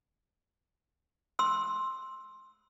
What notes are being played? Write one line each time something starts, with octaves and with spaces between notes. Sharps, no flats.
C6 E6